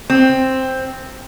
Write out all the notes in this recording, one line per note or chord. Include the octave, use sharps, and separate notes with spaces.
C4